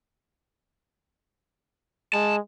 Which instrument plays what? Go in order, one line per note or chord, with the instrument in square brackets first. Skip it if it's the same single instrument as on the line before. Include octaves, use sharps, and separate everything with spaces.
[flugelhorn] G#3 [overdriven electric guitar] A5